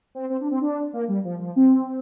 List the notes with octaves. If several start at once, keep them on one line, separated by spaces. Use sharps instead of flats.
C4
C4
D4
C4
D4
A#3
G3
F3
F3
C4